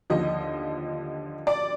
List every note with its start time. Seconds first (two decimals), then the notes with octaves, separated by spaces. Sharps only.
0.10 D#2 D3 F3 D#5
1.47 D5